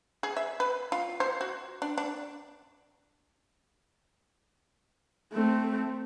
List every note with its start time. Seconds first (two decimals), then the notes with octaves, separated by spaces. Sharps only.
0.23 G#4
0.37 E5
0.60 B4
0.92 F4
1.20 C5
1.41 F#4
1.82 D4
1.98 D4
5.33 A3 C4